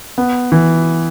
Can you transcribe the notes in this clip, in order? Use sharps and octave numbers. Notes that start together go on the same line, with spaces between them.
B3
E3